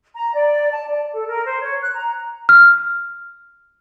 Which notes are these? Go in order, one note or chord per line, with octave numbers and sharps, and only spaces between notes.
A#5
D5
A5
D5
A4
A#4
C5
C#5
F#6
A#5
F6